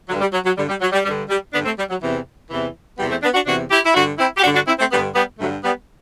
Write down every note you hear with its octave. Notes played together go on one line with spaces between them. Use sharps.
G2 D3 F#3
G3
F#3
F#3
G2 D3 G3
G3
F#3
G3
G2 D3 G3
G3
G2 D3 B3 D4
A3 C4
G3
F#3
E2 C3 E3
E2 C3 E3
E2 C3 E3 G3 B3
A3 C4
B3 D4
D4 F#4
E2 C3 E3 D4 F#4
E4 G4
E4
G2 D3 D4 F#4
C4 E4
G4
G2 D3 D4 F#4
D4 F#4
C4 E4
A3 C4
G2 D3 G3 B3
G3 B3
G2 D3 F#3 A3
G3 B3